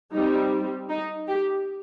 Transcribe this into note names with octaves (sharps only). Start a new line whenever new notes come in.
G3 C4 D#4
D#4
G4